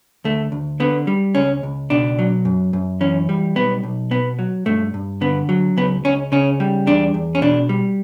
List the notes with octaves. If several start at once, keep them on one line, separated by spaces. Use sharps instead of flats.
D2 A3
D2
D3 B3
G3
C#2 C#4
C#2
B2 D4
F#3
F#2
F#2
E3 C#4
G3
B1 B3
B1
B2 B3
F#3
G2 A3
G2
D3 B3
F#3
C#2 B3
C#2 C#4
C#3 C#4
G3
E2 D4
E2
C#4
B2 D4
G3